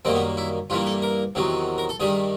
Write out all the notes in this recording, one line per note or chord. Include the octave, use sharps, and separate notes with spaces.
F#2 D#3 G3 A#3 C4
B3
E4
G2 E3 G3 A#3 F4
A4
A#4
E2 C3 D#3 F#3
A#4
A4
G2 D#3 G3 G#4